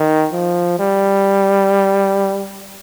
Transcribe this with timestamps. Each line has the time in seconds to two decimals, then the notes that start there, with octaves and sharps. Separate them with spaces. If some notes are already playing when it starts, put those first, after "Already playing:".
Already playing: D#3
0.33 F3
0.79 G3